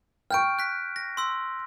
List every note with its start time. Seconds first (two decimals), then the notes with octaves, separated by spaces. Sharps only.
0.30 G5 C#6 F6 G6 D7
0.59 F#6 B6
0.96 A#6
1.17 C6 E6